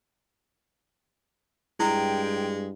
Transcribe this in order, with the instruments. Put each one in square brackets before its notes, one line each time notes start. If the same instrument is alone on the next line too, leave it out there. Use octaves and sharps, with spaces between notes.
[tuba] G2 [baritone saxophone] G#3 [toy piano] E4 [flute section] G5